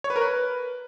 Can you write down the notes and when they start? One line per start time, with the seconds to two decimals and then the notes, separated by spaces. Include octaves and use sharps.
0.04 C#5
0.10 B4
0.16 A#4
0.21 B4